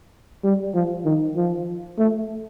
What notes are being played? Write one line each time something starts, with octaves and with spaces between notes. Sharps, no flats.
G3
F3
D#3
F3
A3